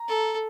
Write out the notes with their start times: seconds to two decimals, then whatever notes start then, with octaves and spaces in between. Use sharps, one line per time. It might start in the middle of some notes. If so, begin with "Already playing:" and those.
Already playing: A#5
0.08 A4